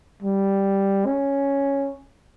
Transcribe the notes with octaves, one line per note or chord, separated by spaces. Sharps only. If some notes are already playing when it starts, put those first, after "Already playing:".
G3
C#4